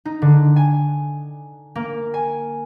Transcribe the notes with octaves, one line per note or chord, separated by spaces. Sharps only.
D#4
D3
G#5
A#3
G#5